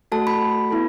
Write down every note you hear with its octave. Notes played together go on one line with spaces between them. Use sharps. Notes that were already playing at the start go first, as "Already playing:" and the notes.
A3 F#4 A4 A5
B5
B3 E4 A4